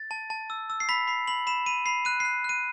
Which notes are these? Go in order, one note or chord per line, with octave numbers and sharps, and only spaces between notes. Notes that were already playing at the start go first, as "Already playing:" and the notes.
Already playing: A6
A5
A5
E6
E6
C7
B5 B6
B5 C7
B5 F#7
B5 E7
B5 D#7
B5 C7
F#6 D#7
F#6 C7
F#6 D#7